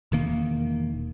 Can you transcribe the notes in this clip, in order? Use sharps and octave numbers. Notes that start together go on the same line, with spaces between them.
E1 D#3 A#3